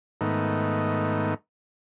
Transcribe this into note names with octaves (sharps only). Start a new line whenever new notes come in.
G#2 D#3 A3 B3 D#4